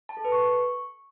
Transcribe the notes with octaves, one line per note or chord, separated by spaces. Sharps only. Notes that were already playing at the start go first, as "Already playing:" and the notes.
A5
A4
B4
C#6